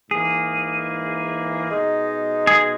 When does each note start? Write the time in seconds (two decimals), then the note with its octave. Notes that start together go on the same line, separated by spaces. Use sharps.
0.10 G#2 E3 A#3 G#4
1.69 B2 G#3 D#4
2.47 G#4